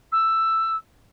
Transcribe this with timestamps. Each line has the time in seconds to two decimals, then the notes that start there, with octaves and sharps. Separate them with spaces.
0.12 E6